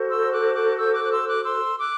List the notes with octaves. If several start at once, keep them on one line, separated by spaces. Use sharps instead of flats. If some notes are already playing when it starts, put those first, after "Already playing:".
Already playing: F#4 A4 C5
C6 E6
D6 F#6
D6 F#6
E6 G6
D6 F#6
F#6
C6 E6
D6 F#6
C6 E6
D6 F#6